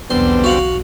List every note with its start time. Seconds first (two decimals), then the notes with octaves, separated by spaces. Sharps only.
0.10 B1 E2 B2 D3 G3 B3 C4 C6
0.44 F#4 F5 F#5